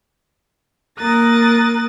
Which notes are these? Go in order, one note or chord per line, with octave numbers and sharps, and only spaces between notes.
A#3 A#4 D#6 F#6 A6 A#6